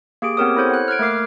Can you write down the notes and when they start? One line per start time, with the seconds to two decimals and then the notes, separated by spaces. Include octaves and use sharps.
0.22 A#3 G4 G#4 D7
0.37 B3 C4 G4 A#4 C#5 D#6
0.56 E4 A4 C5 C#5
0.70 F#5 F#6
0.88 F6 F#6 G#6 D7
0.99 A3 A#3 A#4 D6 C7